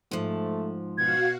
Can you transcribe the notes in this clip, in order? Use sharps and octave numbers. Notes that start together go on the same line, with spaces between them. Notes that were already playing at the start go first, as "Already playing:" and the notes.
G#2 F3 A3
B2 F#4 F5 F#5 G#6